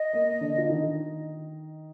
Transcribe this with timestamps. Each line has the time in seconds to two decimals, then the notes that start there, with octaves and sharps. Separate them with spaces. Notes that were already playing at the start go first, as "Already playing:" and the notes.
Already playing: D#5
0.13 A#3
0.41 D3 D4
0.58 F4
0.69 D#3 D#4